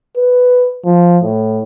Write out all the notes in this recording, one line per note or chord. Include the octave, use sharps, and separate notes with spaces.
B4
F3
A2